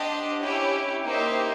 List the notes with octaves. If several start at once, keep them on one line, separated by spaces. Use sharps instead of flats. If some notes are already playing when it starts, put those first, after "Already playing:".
Already playing: D4 G4 C5 D#5 F#5
C#4 E4 G4
A#3 D#4 G4 C5 E5